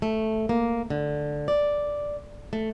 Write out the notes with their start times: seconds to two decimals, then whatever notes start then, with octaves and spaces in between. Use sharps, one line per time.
0.02 A3
0.49 A#3
0.90 D3
1.48 D5
2.53 A3